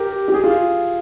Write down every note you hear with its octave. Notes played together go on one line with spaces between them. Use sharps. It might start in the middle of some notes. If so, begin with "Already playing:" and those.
Already playing: G4 A#4
G4
G#4
F4